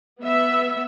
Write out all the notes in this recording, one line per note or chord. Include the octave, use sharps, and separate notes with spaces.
B3 E5